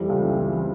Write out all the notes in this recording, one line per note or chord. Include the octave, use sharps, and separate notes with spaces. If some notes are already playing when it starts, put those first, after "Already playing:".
Already playing: F2 E3 G3
C#2
E3
E3
E3